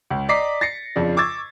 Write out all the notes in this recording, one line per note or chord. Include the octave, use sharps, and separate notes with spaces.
C#2
D5 D#5 A#5 D6 B6 C7
A6 A#6 C7 C#7
F2 C#3 F3 D4
C#6 D6 E6 G#6 A6